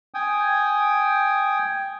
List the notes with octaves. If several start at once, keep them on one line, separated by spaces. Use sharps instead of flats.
G5 G#5 D#6